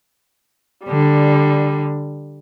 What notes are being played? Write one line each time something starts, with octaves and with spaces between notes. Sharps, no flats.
D3 G3